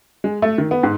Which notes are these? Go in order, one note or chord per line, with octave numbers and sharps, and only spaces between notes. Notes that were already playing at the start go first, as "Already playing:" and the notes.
G#3
A3
D#3
B3
G#2